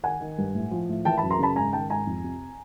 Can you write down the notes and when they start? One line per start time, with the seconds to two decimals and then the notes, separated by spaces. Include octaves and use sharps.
0.03 D#3 F#5 G#5
0.21 D#3
0.38 G2
0.55 A2
0.71 F3
0.89 A2
1.05 E3 G5 A5
1.17 A5 B5
1.23 F#2
1.30 A#5 C6
1.39 C#3 A5 B5
1.56 G#2 G#5 A#5
1.73 D#3 G5 A5
1.90 G#2 G#5 A#5
2.07 F2
2.24 C3